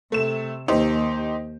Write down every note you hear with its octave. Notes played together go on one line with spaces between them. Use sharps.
C3 A3 E7
D#2 D#4 G4 C5